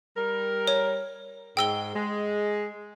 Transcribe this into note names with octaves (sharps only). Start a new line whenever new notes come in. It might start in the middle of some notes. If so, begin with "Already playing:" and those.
G3 A#4
C#5
G#2 G5 E6 G7
G#3